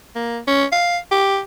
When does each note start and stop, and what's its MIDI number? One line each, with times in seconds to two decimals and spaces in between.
0.16 0.39 58
0.47 0.64 61
0.72 0.98 77
1.12 1.39 67